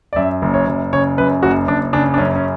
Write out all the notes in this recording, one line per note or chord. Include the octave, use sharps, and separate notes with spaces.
D5
F#2 E5
F#1
C#5
F#1
C#3 C#5
F#2 B4
F#1 F#4
F#1 D4
C#3 D4
D4
F#2 C#4
C#4